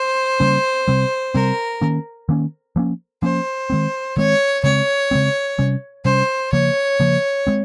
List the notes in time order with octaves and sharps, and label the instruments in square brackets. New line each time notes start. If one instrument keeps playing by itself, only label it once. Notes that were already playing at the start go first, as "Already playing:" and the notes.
Already playing: [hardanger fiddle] C5
[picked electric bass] C#3 G3 A#3 C#4
C3 G3 C4
[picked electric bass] C3 G3 C4 [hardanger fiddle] A#4
[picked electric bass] D#3 A#3 C#4
D#3 A#3 C#4
F3 A#3 C#4
[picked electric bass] F3 A#3 C#4 [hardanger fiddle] C5
[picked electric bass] D#3 G#3 C4
[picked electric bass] D#3 G#3 C4 [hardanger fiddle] C#5
[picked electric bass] C#3 G#3 C4 [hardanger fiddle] C#5
[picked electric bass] C#3 G#3 C4
C3 G3 C#4
[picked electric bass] C3 G3 C#4 [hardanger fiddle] C5
[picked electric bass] C#3 F3 A#3 [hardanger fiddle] C#5
[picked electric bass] C#3 F3 A#3
G#3 C4